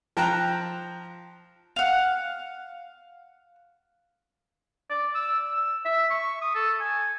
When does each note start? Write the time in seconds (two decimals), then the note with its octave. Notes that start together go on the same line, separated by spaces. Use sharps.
0.17 F3 G5 A5 A#5 F#6
1.76 F5 F#5
4.90 D5
5.15 E6
5.46 E6
5.85 E5
6.10 C#6
6.42 D#6
6.55 A4
6.81 G#5